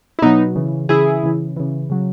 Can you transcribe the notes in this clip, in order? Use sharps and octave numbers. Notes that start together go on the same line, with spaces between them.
E4
B2 F#3 B3 D#4
C#3 E3
C#3 E3 E4 G#4
C#3 E3
C#3 E3
C#3 F#3